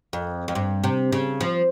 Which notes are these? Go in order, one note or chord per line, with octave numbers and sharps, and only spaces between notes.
F2
F2
G2
C3
C#3
F3